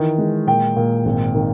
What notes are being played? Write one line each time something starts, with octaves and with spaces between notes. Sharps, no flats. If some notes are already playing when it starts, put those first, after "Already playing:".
Already playing: D#3 E3
G#3
A#2 G5
A#2
G#1
D#3